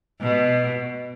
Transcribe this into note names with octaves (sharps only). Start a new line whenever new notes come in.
B2